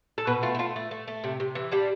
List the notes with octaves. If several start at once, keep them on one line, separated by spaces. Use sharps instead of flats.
A4
B2 B4
A3 F4
E4
A3 F4
A3
A3
A3
C3
C3
E3
G3 D4